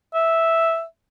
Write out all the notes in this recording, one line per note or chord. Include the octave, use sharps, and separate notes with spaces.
E5